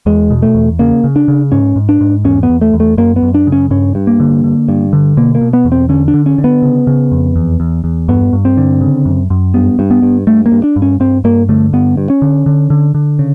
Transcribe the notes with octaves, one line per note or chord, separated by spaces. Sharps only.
E2 G#3
B2
A3
E2
C#3 A#3
C#3
D4
C#3
G#2 C#4
G#2
D4
G#2
E2 C#4
B3
E2
A3
E2
A3
F#2 A#3
B3
F#2
D4
C#3
C#4
G2 C#4
G2
A#3
D3
D3
G2
D3
B2 A#3
A#3
B2
B3
E2
C4
D3 C#4
D4
D3
C#4
D3
B3
C#3
C#3
F2
E2
E2
E2
G2 B3
G2
C4
D3
C#3
F#2
F#2
G2 B3
G2
B3
G2
G2 A3
A#3
G2
D4
G2
C#4
G2 C4
G2 A#3
D3 A3
G2 B3
G2
C#4
D3
D3
D3
D3
C#3